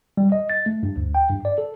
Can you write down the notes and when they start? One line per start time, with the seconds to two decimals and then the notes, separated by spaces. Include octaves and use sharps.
0.17 G3
0.32 D#5
0.50 A6
0.66 A3
0.83 G2
0.96 D2
1.15 G5
1.30 G2
1.45 D5
1.58 A4